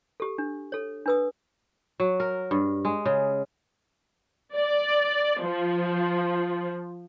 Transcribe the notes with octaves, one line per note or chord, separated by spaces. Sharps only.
G4 A4
D4
A4 C#5
D4 B4 D#6
F#3
A#4
G2
G#3
C#3
D5
F3